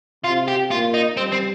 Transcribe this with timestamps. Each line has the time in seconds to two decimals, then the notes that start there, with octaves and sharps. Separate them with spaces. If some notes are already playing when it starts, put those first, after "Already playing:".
0.24 C3 F4
0.48 G4
0.71 A#2 F4
0.94 D#4
1.17 G3 C4
1.32 C4